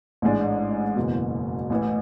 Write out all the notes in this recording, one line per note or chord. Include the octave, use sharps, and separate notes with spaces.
A1 G#2 G#3 D4
F#1 E2 B2
A1 A2 E3